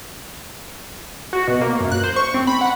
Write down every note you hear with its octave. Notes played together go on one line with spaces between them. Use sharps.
F#4
B2
A#3
F#2
F#6
C5
C#6
C4
B5
F#5